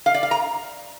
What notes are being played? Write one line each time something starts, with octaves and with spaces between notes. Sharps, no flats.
F5
D5
F5
A#5